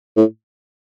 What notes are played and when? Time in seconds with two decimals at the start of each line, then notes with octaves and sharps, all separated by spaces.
0.17 A2